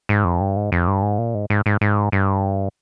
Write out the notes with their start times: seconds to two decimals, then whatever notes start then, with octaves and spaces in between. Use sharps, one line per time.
0.09 G#2
0.24 F2
0.41 G2
0.56 G#2
0.72 F2
0.87 G2
1.02 G#2
1.18 A#2
1.34 G#2
1.50 G#2
1.66 G#2
1.81 G#2
2.12 G2